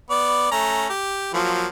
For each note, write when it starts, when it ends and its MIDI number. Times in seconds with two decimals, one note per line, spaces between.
0.10 0.49 59
0.10 0.49 74
0.51 0.88 57
0.51 0.88 61
0.51 0.88 82
0.90 1.31 67
1.34 1.66 53
1.34 1.66 54
1.34 1.66 58